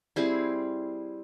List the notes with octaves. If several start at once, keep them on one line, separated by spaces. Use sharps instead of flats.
G3 C4 E4 G#4